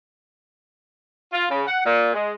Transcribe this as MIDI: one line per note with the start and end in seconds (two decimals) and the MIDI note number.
1.32 1.44 65
1.50 1.61 49
1.67 1.82 78
1.85 2.11 46
2.14 2.32 56